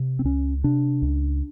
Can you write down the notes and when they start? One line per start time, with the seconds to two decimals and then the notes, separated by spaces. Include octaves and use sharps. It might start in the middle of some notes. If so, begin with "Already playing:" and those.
Already playing: C3
0.19 C4
0.24 C#2 C#4
0.64 C3 D4
1.02 C#2